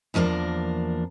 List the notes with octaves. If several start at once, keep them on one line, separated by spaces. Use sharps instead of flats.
E2 F3 A#3 D4 A#4